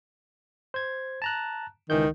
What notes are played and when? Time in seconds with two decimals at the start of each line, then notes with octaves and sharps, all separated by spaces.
0.74 C5 G#6
1.22 A5 A#5 F#6
1.90 C#2 D#3 E3 G6